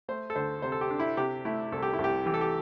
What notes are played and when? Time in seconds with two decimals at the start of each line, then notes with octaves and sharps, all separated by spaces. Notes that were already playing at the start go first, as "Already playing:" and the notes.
0.09 A3 C5
0.30 A4
0.36 D2 C5
0.62 C3 C5
0.72 A4
0.81 G4
0.90 D4
1.00 E4
1.17 C3 G4
1.45 A3 E4
1.72 C2 A4
1.82 G4
1.93 E4
1.98 C2
2.04 G4
2.26 E3 G4
2.34 A4
2.41 G4